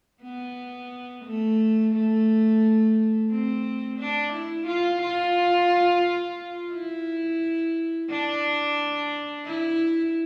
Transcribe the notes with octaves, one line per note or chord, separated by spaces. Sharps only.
B3
A3
A3
C4
D4
E4
F4
F4
E4
D4
E4